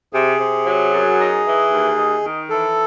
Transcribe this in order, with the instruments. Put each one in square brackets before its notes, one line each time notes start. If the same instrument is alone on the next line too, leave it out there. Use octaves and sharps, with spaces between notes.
[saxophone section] C3 [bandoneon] G#4
[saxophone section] C3
F#3
F#2
D#4
E3
D#2
D#4
D#3
[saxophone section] E3 [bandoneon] A4